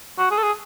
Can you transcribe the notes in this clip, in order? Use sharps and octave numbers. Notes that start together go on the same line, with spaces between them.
F#4
G#4
A4
G#4